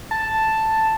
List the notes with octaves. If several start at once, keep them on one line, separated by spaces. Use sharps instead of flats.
A5